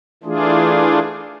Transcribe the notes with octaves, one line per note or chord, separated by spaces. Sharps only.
E3 A3 D4 F4 G#4